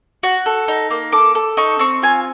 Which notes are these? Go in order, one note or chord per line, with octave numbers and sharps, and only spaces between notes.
F#4
A4
D#4
A#3
A4 D6
A4
D#4 C#6
C4 C#6
F4 G#5